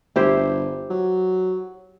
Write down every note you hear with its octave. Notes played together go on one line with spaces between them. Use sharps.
G1 E4 G4 C5
F#3